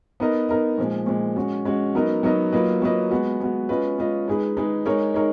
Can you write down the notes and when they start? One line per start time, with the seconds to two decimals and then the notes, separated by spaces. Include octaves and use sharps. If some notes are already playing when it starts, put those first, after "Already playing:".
0.20 B3 D#4 A#4 D#5
0.49 B3 D#4 A#4 D#5
0.78 A#2 F3 G#3
1.06 A#2 F3 G#3
1.36 G#3 C#4 F#4
1.65 G#3 C#4 F#4
1.95 F#3 B3 D#4 A#4 D#5
2.23 F#3 B3 D#4 A#4 D#5
2.53 F#3 A#3 F4 B4 D#5
2.82 F#3 A#3 F4 B4 D#5
3.11 G#3 B3 F#4
3.40 G#3 B3 F#4
3.69 G#3 C#4 F4 B4 D#5
3.98 G#3 C#4 F4 B4 D#5
4.28 G#3 D#4 G#4 B4
4.57 G#3 D#4 G#4 B4
4.86 G#3 D#4 A#4 C#5
5.14 G#3 D#4 A#4 C#5